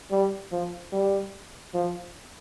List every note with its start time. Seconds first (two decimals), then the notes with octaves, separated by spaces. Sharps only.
0.11 G3
0.52 F3
0.92 G3
1.74 F3